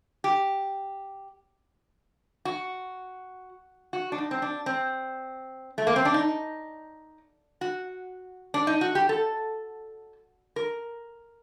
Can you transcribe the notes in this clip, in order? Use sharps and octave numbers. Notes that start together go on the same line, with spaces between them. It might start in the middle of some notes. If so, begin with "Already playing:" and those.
G4
F#4
F#4
D4
D#4
C4
D4
C4
A3
A#3
C4
D4
D#4
F#4
D4
D#4
F#4
G4
A4
A#4